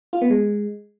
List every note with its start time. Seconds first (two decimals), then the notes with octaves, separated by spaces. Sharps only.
0.13 F4
0.22 B3
0.30 G#3